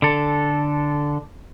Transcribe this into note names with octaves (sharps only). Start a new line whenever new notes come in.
D3 A4